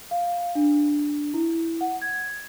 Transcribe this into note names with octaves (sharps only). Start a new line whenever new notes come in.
F5
D4
E4
F#5
G#6